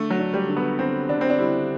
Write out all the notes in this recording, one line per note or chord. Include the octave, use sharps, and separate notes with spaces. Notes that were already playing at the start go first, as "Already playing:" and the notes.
Already playing: D3 A3
F#3
D4
G3
D3
B3
D3 C4
D3 D4
C4
D4
G3 E4